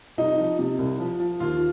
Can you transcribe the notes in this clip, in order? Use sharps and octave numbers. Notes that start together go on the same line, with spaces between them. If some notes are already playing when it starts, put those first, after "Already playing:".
C2 D#4
F3
C3
C2
F3
F3
D#2 F4